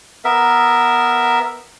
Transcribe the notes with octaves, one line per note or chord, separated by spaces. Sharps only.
B3 A#4 E5